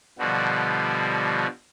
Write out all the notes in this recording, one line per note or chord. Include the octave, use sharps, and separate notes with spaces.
B2 D3 F3 G3 F#4